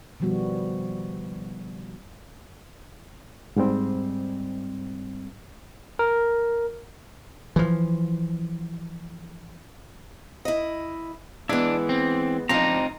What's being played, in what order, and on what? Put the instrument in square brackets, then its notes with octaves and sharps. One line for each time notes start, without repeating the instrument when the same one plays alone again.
[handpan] B2 D#3 F3 G3 B3 F#4
[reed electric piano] G#2 G3 C4
[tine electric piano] A#4
[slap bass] E3 F3
[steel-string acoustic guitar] E4 D#5
[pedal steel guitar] E3 E4 [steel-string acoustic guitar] G#3 B3 [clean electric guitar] D4
[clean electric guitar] C4
[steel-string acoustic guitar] F3 D4 [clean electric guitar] C4 D#4 [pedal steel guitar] A#5